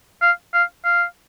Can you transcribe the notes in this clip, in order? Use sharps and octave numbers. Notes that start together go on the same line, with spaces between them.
F5
F5
F5